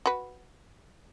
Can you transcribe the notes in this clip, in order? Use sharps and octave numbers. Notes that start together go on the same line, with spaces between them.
F#4 B4